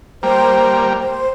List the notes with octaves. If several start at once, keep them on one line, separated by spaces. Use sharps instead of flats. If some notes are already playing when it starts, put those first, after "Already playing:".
G3 A#3 C5
C5